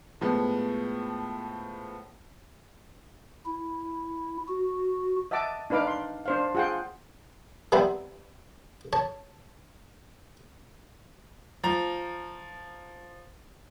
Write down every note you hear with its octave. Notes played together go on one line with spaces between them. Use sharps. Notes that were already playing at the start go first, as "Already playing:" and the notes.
A2 F3 G#3 B3
E4
F#4
D#5 E5 F#5 A5 D6
D4 D#4 B4 F5 D6
C6
D4 C5 F5
F4 G#4 F#5 G5 C6
D#3 G3 B3 C4 E4
C#5 A5
F3 A#5